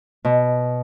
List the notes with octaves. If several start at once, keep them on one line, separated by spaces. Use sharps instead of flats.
B2